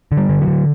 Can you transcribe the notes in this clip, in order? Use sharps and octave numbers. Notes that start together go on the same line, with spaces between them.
D3
G3
D3
F#3
D3